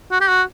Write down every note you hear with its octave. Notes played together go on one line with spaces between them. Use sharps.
F#4
G4
F#4